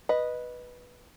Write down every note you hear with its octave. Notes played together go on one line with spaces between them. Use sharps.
B4 D#5